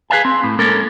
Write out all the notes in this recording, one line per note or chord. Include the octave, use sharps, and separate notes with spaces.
G#4 B4 D5 F5 G#5
C4
A2
G#3 A#3 C#4 A4 A#4